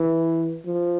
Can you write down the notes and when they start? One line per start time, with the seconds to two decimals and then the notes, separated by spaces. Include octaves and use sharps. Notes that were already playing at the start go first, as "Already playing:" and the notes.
Already playing: E3
0.66 F3